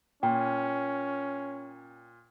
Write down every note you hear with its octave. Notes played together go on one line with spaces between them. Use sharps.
A#2 C#4 G5